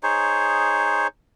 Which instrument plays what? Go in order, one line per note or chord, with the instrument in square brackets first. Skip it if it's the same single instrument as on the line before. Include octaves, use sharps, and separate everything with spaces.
[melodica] D#4 G#4 C5 C#5